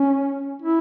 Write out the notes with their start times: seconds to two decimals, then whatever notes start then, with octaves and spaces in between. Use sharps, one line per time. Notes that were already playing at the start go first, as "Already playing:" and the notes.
Already playing: C#4
0.62 E4